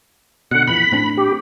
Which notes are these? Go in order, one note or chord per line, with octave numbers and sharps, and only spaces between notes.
B2 D3 F#5
A#1 F2 E3 B5
A2 C4 D4
G4